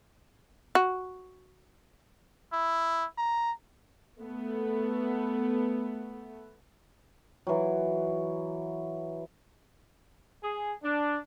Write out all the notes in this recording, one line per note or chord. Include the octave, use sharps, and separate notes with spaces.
F#4
E4
A#5
A3 B3
E3 F#3
G#4
D4